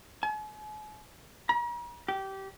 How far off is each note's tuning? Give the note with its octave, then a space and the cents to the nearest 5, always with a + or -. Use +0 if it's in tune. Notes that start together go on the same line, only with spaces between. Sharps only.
G#5 +45
A#5 +45
G4 -20